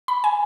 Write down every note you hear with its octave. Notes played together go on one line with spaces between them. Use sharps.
B5
G#5